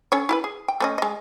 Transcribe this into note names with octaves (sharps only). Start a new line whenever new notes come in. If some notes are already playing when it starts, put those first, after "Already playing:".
C#4 A4 C#5
E4 G4 B4
G#4
G5
A3 C#4 D#5
G#3 D#5